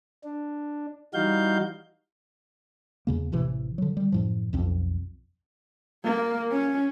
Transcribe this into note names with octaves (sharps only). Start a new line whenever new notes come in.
D4
E3 G3 D#4 F#4 F5 G6
E2 C#3 A#3
A1 C3 E3
D3 F#3
G3
F#2 A2 F3
B1 F2 C4
A#3
C#4